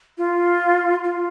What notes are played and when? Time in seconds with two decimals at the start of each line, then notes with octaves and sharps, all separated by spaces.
0.18 F4
1.04 F4